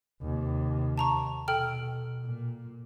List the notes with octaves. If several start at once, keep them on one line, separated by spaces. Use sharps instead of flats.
D#2 C3
A5 A#5 C#6
B2 A4 G5 F6
A#2